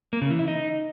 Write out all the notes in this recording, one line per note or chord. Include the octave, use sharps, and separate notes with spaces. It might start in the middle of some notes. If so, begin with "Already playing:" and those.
A#3
C#3
E3
E4
D#4